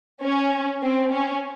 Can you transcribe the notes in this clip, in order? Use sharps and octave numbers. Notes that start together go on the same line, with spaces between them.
C#4
C4
C#4